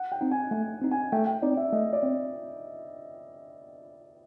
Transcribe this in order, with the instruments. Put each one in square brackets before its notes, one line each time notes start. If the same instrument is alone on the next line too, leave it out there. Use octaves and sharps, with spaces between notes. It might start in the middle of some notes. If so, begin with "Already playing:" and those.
Already playing: [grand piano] F#5
G5
[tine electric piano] C4 D#4
[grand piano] G#5
[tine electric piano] A3 [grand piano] G#5
[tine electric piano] C4 D#4
[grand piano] G#5
[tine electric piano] A3 [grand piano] G5
[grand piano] G5
[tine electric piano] C4 D#4 [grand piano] D5
[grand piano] E5
[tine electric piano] A3 [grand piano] D#5
[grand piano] D5
[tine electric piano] C4